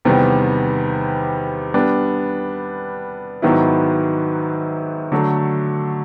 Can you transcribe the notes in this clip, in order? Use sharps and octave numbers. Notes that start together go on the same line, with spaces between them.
E2 C3 D#3 G3 B3
G3 B3 D4
G#2 D#3 F#3 B3 E4
D3 F#3 A3